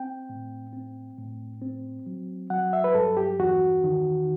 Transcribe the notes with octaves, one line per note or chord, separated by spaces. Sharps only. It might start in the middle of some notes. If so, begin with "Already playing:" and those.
Already playing: C4 G5
A2
C4
A2
C4
F#3
F#3 F#5
E5
B4
G2 A4
G4
E2 F#4
D#3